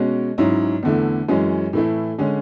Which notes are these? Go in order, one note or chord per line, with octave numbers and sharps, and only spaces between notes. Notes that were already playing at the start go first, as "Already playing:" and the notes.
Already playing: B2 G#3 C#4 F#4
G#2 F#3 C#4 E4
E2 D3 A3 E4
F#2 E3 G#3 C#4
A2 E3 A3 E4
D3 G#3 C#4